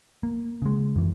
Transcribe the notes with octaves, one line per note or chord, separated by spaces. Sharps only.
A#3
C#3 G#3
F#2 E3